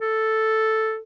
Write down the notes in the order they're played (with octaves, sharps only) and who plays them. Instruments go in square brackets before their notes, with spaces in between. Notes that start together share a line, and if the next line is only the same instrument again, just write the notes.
[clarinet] A4